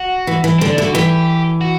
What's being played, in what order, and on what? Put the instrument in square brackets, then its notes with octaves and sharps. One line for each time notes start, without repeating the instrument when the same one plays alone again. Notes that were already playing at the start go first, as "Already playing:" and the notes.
Already playing: [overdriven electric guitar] F#4
[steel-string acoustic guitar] E3
E3
[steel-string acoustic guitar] D3 [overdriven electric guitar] C4
[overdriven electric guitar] D4
[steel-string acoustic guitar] D3 [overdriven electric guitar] E4
[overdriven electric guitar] F#4
[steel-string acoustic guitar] E3 [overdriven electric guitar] G4
[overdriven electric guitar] F#4